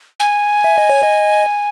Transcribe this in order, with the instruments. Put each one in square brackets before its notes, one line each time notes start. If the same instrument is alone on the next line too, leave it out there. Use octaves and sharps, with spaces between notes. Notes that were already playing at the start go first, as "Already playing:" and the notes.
[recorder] G#5
[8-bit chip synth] E5
D#5
C#5
D#5